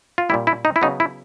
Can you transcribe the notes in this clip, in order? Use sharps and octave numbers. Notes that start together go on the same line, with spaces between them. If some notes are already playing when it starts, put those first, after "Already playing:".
F4
A#2 G3 A#3 E4
E4
D#4
E4
C#3 F#3 B3 D#4
E4